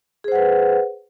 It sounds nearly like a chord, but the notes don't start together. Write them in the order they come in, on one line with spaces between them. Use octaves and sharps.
G#4 C5 F#5 B4